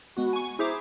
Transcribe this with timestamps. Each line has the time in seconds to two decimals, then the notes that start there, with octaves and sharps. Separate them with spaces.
0.17 G#3 B3 F#4
0.33 G#5 C#6
0.59 E4 G#4 C5 E5 A#5 D6